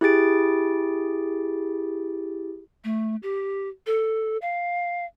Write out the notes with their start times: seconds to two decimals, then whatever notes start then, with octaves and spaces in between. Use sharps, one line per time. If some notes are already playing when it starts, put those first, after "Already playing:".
0.01 E4 G4 G#4 A6 D7
2.84 A3
3.23 G4
3.86 A4
4.42 F5